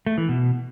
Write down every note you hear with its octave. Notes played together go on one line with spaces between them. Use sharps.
A3
E3
B2